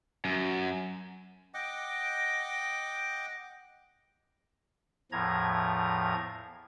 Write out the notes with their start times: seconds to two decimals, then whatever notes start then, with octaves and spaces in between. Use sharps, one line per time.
0.25 F#2
1.54 D#5 F#5 G5 D6
5.12 E2 A2 F3 A#5 G#6